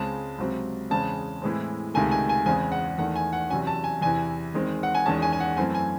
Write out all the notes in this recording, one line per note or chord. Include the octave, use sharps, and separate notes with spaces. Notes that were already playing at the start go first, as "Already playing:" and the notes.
Already playing: C#2 C#3 G#3 C4 A5
C#2 C3 F#3 C4
E2 C#3 G#3 C4 A5
A2 E3 G#3 C4
C#2 C3 D#3 A3 G#5
G#5
G#5
E2 C#3 G#3 C4 G#5
F#5
E2 D#3 A3 F#5
G#5
F#5
E2 C3 F#3 C#4 G#5
A5
G#5
E2 C3 E3 G#5
E2 D#3 G#3 C4
F#5
G#5
E2 D#3 G#3 C#4 A5
G#5
G#5
F#5
F#2 E3 A3 C4 G#5
G#5